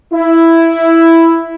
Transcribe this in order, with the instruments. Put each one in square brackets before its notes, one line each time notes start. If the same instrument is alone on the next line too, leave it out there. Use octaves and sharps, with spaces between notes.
[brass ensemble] E4